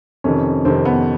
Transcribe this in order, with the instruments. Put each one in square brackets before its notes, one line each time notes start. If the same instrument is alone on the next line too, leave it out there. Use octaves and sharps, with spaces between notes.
[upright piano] F2 C3 D#3 C#4
F2 C3 D#3 C4
B3